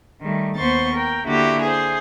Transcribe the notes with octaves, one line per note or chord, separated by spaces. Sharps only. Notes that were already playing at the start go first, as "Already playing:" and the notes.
D#3 G3 A3
D#2 B3 C5 C6 C#6 A6
A#4 G5
D3 A#3 E4 F#4 G4
G#4 C5